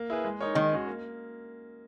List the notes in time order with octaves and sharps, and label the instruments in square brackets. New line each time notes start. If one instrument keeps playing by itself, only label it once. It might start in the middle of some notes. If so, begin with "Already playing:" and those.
Already playing: [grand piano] A#3
E4 G#4 B4
G#3
D#4 A#4 C#5
[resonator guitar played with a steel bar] D#3 [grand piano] G#3
[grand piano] C#4 F#4
A#3